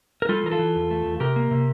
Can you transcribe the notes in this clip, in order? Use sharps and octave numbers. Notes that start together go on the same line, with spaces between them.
A#4
G3 F4 A4
E3 A#4
F4 A4
E3
E2
A3
E2
C3 G4 A#4
A#3
C3